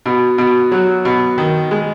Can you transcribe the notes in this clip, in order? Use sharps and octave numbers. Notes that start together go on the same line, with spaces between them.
B2
B2
F#3
B2
D#3
G#3